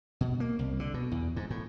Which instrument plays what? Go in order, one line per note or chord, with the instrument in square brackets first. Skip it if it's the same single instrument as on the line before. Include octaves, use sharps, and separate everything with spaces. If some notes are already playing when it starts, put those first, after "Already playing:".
[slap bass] B2
A#3
C2
D3
B2
E2
G#2
A2